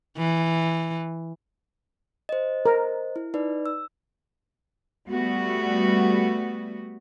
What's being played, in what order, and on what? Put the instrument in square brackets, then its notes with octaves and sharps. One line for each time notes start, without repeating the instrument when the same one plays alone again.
[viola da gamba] E3
[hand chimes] C5 D#5
[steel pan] A#4
[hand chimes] E4
D#4 B4 D5
E6
[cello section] G3 A3 B3 F#4